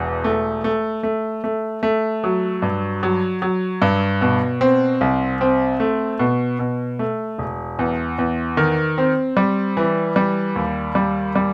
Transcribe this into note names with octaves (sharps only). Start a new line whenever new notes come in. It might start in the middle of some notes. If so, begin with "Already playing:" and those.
Already playing: E1 E2
A3
A3
A3
A3
A3
F#3
G2
F#3
F#3
G2
B2
C4
C2
C4
A3
B2
B2
A3
E1
E2
E2
D#3
C4
G3
E3
G3
D#2
G3
G3